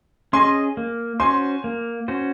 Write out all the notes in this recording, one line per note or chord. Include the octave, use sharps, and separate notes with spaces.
C#4 G#4 D#5 G#5 C6
A#3
C#4 F#4 C5 G#5 C6
A#3
C#4 F#4 C5